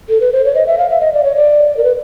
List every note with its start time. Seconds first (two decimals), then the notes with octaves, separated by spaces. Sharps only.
0.09 A4
0.21 B4
0.33 C5
0.44 C#5
0.55 D#5
0.66 E5
0.78 F5
0.90 E5
1.01 D#5
1.13 D5
1.23 C#5
1.36 D5
1.77 A#4
1.84 B4